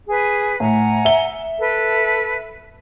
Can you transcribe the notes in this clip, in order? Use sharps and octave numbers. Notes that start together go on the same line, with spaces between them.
G#4 B4
A2 F#5 G#5 A#5
E5 G7
A4 B4